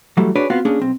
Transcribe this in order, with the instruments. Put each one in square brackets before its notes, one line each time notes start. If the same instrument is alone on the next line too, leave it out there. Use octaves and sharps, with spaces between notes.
[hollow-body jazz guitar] E3 F#3 G3 A3
D4 F#4 G#4 B4 C#5 D5
B3 C4 F4 F#4 F5
A#3 C#4 D4 G#4
B1 C4